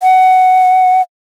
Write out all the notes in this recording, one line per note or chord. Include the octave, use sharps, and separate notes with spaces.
F#5